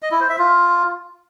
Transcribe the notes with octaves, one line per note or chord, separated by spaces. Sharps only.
D#5
E4
C5
E5
F4